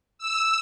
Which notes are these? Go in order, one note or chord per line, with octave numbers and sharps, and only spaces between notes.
E6